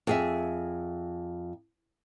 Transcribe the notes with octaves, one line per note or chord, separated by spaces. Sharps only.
F2 G#4 E5